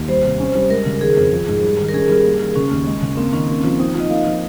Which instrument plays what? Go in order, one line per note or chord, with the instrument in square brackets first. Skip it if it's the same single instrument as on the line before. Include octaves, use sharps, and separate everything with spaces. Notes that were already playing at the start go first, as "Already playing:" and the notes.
Already playing: [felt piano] D#2
[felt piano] G3 [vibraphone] C5
[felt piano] C3
C#4
G3
[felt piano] G#3 [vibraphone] A#4
[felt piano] C#3
[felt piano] D#3 [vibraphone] G#4
[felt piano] F2
F3
G#2
G3
D#3
[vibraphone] A#4
[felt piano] C#4 [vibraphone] G#4
[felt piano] G3
A#3
D#3
[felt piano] C#3 [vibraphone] C#4
[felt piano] D#2
G#3
C#3
[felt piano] A#3 [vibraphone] C4
[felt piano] D#3 [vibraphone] C#4
[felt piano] A#3
F3
[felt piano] C4 [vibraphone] D#4
[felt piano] F3
[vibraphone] D#5
[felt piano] A#3 [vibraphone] F5
[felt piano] F3